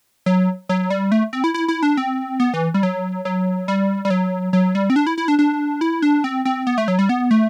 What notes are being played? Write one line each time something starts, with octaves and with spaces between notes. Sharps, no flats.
F#3
F#3
G3
A3
C4
E4
E4
E4
D4
C4
B3
E3
G3
F#3
F#3
G3
G3
F#3
F#3
G3
C4
D4
E4
E4
D4
D4
E4
D4
C4
C4
B3
A3
F#3
G3
B3
A3